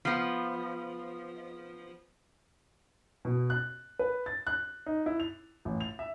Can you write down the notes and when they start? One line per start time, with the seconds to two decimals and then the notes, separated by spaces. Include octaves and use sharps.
0.05 F3 B3
3.25 B2
3.50 F#6
3.99 B4
4.26 A6
4.47 F#6
4.86 D#4
5.06 E4
5.20 F7
5.65 A1
5.81 F7
5.99 E5